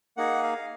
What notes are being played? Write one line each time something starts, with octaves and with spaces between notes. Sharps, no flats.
A#3 D#4 G#4 F#5
F5